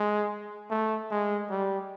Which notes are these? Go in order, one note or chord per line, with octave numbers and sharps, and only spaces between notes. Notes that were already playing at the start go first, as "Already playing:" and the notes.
Already playing: G#3
A3
G#3
G3